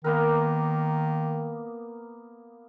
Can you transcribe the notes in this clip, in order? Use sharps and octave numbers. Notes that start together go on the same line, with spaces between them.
D#3 A#3 B3 A#4